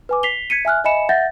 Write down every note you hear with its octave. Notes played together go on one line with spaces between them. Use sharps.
B4 G#5 D6
B6 C7 F7 G7
G#6 B6 C#7 D#7
E5 G#5 F6 F#6
D#5 E5 G#5 B5 C#7 E7
E5 F#5 G6 A6 A#6